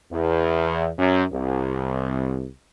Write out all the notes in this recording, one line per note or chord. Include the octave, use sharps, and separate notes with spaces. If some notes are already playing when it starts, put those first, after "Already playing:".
E2
F#2
C2